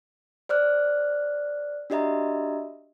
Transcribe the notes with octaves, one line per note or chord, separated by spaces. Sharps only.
C5 D5 F6 F#6
D4 F#4 G4 D#5 E5 A#5